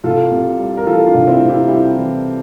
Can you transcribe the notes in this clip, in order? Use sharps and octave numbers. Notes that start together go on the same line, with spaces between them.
C2 F4 A4
C3
G3
A#4
E3 F4 A4
D4 F4
C2
C4 E4
C3
E4 G4
G3 E4 G4
E3